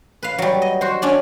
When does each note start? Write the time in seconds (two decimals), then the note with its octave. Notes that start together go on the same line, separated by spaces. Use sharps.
0.23 B4 F5
0.38 F#3 G3
0.62 D#5
0.81 F#4 C5
1.02 C#4 D4 D5